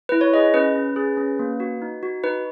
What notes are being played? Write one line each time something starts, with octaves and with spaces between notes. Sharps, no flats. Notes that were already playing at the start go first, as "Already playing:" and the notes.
E4 B4
C#5
G#4 D#5
C#4 B4
C#4
G#4
C#4
A#3
F#4
D#4
F#4
D#4 B4